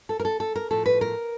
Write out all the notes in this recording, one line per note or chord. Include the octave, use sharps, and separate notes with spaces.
A4
A#4
A4
A4
A#4
A2 F3 A3 A4
B4
A#4